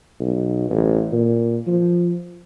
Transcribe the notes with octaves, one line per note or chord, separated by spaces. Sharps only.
B1
A1
A#2
F3